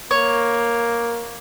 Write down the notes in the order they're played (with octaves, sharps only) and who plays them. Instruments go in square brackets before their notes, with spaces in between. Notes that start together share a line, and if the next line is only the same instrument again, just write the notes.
[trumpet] A#3 [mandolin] C#5